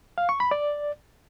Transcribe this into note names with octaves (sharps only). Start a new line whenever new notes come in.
F5
C#6
B5
D5